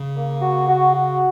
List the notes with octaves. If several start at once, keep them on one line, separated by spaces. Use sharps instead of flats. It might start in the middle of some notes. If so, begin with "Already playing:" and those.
Already playing: C#3
A#3
F#4
F#4
F#4